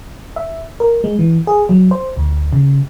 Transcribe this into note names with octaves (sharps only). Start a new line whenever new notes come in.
E5
A#4
G#3
E3
G#4
F#3
C5
D2
C#3